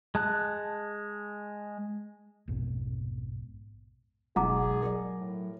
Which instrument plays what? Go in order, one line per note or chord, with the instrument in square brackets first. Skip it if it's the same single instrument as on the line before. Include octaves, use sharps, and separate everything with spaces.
[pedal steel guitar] G#3 A5 F#6
[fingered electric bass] A#1 F2 G#2 B2
[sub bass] F1 [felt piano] B1 G#2 [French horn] G#4 [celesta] F#5 A#5 D6
[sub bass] F#3 [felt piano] A#4 D5
[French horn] A2